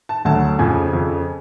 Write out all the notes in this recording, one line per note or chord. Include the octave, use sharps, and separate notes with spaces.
A5
D2 D3 F#3 A5
F2 C#3 F3 G#5
F2 C#3 F3